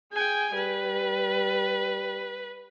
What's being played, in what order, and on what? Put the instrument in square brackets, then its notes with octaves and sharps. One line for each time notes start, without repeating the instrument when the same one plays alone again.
[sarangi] G#4 [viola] G5 G#5
[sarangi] G3 [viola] B4